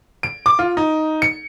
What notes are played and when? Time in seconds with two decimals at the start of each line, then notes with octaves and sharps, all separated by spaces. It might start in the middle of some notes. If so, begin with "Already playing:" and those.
0.23 D7
0.46 D6
0.59 F4
0.77 D#4
1.22 C#7